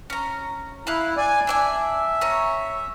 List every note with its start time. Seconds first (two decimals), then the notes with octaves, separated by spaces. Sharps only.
0.10 C#4 A#5
0.87 E4 F5 B5 F#6
1.17 D5 G#5
1.47 D4 D5 E5 G#5
2.21 C#4 C#5 A#5